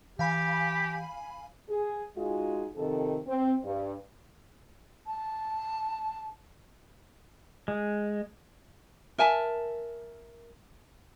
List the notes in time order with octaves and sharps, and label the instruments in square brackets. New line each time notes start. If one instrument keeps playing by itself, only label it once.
[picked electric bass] E3 [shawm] G4 [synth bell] F5 G#5 B5
[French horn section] G#4
G#3 D#4 F4 F#4 G#4
F2 C3 D#3 A4
C4
G2
[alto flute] A5
[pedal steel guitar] G#3
[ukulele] A#4 E5 G#5 A5